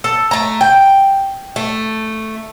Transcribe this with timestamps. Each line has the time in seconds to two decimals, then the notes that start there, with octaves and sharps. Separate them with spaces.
0.04 A4
0.31 A3 A#5
0.61 G5
1.56 A3